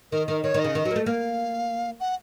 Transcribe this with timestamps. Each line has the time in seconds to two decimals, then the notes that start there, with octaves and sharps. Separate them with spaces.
0.12 D#3 A#4
0.27 D#3 A#4
0.43 D#3 C#5
0.54 D#3
0.60 C#3 D#5
0.75 D#3
0.85 F#3
0.91 A#3
0.96 A3
1.06 A#3 F5
2.00 F#5